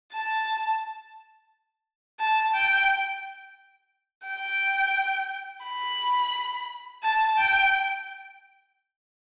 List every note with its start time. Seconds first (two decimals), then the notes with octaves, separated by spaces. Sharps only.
0.13 A5
2.20 A5
2.55 G5
4.27 G5
5.66 B5
7.04 A5
7.38 G5